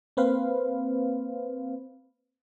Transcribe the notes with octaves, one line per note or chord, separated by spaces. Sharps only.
A#3 C4 B4 C5 F5